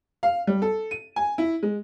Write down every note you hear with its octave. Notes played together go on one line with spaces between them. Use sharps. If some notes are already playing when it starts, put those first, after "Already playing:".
F5
G3
A4
D#7
G#5
E4
G#3